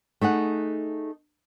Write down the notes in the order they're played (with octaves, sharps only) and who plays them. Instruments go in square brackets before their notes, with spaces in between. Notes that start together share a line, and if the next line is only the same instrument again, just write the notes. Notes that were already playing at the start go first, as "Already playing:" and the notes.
[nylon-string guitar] A3 D#4 G#4 F#5